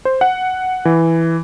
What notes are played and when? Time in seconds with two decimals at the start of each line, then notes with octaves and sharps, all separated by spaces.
0.05 C5
0.21 F#5
0.85 E3